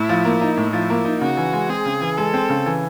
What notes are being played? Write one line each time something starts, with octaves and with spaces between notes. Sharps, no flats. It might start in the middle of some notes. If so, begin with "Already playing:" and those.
Already playing: A2 E4
F3
A#3
D#4
A2
F3 E4
A#3
D#4
C#3 F#4
E3
G#3
C4 G#4
C#3
E3
G#3 A4
C4
C#3
E3